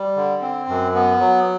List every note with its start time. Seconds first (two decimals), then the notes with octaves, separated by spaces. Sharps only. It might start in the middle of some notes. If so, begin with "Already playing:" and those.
Already playing: G3
0.16 D3
0.42 C4
0.68 F#2
0.95 B3
1.20 F#3